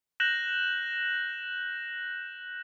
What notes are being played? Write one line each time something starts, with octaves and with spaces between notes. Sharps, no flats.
F#6 G6 A#6 E7 F#7